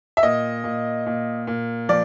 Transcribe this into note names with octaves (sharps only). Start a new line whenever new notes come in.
E5
A#2 D#5
A#2
A#2
A#2
F3 D5